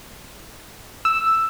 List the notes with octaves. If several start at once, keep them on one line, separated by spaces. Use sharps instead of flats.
E6